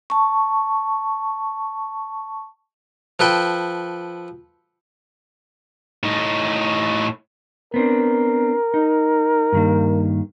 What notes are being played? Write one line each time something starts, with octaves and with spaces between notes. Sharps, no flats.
A5 C#6
F3 A4 B4 G5
A2 D#4
B3 C4 D4 A#4
D#4
G2 D#3 A#3